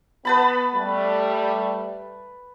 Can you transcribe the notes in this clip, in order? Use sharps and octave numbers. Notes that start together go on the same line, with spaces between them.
B3 B4 A5 B5
G3 A3